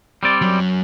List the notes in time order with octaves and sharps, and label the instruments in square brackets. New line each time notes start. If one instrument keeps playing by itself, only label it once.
[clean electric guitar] G3 C4 D5
[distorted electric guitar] F#2 F#3